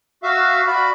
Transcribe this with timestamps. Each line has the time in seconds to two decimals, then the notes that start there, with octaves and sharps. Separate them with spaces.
0.23 F#4 E5 F5
0.67 F#4 D5 B5